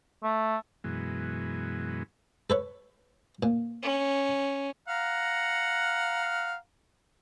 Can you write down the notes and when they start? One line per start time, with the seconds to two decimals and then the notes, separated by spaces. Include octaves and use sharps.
0.23 A3
0.84 F#2 B2 E3 G#3
2.50 A4 B4 C#5
3.43 A#2
3.82 C#4
4.88 F5 F#5 A#5